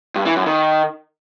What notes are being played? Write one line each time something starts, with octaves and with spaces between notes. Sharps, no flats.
G2
E3
F#2
D#3